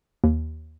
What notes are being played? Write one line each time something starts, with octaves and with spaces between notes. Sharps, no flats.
D#2